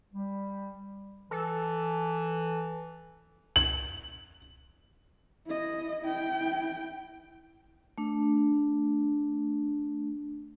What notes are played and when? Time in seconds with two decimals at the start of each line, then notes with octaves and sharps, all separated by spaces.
0.13 G3
1.31 E3 A4
3.56 F#7
5.46 E4 D#5
6.00 E4 G5
7.98 A3 D4